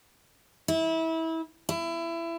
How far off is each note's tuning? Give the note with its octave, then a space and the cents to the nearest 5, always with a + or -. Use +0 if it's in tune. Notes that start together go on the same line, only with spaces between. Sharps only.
E4 -25
E4 +25